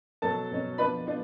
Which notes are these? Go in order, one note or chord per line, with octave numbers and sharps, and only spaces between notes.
B2 F#3 C#4 A4 A5
B2 F#3 C#4
F3 B3 D4 B4 B5
F3 B3 D4